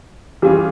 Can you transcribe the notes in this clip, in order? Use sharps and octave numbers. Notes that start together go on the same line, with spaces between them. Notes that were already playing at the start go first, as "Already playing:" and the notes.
E3 G3 C#4 F4 G4 G#4